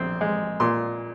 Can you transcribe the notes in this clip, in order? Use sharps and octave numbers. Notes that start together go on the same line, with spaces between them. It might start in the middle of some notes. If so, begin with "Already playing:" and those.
Already playing: A#1 C4
G#3
A#2 C6